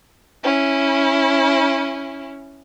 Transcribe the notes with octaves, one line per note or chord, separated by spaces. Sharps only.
C#4 E4